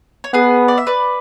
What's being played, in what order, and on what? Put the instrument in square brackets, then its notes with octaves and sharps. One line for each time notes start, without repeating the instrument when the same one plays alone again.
[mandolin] C#5
[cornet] B3 [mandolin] G#4 B4
[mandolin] D5
E5
B4 D5